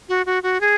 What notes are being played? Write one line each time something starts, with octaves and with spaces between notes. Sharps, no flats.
F#4
F#4
F#4
G#4